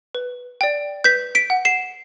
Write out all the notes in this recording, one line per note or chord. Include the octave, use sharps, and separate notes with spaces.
B4
D5 G5
B4 G6 B6
B6 D7
F#5
C7 E7